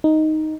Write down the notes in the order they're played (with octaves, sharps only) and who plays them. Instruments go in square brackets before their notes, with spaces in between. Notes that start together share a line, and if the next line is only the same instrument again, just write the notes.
[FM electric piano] D#4